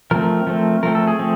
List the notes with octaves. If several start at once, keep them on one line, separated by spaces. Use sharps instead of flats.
F3 A3 C4 A#4
F3 A3 C4
F3 A3 C4 A#4
A4
G#4
F3 A3 C4